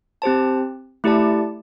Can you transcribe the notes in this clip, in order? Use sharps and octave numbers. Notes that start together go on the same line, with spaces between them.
C4 G4 C5 A5
A3 E4 G4 D5 A5